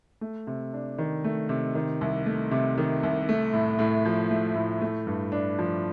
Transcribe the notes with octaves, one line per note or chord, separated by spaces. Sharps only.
A3
C3
D4
D#3
A3
C3
D#3
C2
A3
C3
D#3
C2
A3
A2
A2
F3
A3
A2
A3
G2
D4
F3